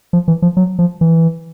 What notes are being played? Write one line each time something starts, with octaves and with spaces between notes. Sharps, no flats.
F3
E3
F3
F#3
F3
E3